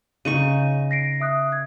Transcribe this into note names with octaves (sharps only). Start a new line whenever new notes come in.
C#3 D#4 C#6 D#7
A#6 C7 D7
E5 D#6 F#6
G#6